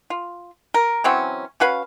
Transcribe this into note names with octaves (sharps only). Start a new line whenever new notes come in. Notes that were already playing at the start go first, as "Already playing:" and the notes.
F4
A#4
E3 F#3 C4 C#4
C#4 F#4 B4 F5